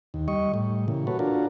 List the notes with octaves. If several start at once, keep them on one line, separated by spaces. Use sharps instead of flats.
D#2
G3 D#5 C#6
A2 G3
A#2 C#3 E3
F#4 A4 B4 C#5
D4 F4 F#4 A4 A#4